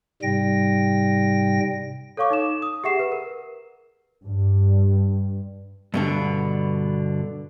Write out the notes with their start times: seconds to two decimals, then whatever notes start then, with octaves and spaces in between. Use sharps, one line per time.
0.22 G#2 C3 G3 G5 A#6
2.17 A4 C#5 F5 C#6 D6
2.30 D#4 E7
2.62 D#6
2.84 G4 G#4 E5 F#5 C7 E7
2.99 B4
3.12 A#4
4.25 G2
5.94 G2 B2 D3